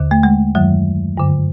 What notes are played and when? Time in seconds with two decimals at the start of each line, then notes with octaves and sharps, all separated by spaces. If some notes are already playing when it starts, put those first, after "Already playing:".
Already playing: D#2 D3
0.11 A3
0.23 G#3
0.55 F#2 D#3 F#3
1.17 G2 D3